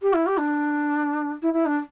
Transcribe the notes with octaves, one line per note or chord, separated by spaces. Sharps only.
G4
E4
G4
D4
E4
E4
D4